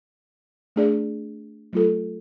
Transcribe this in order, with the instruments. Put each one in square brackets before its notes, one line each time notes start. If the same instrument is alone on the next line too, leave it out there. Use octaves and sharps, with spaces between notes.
[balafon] A3 D4 G#4 D5
F#3 A3 F4 A4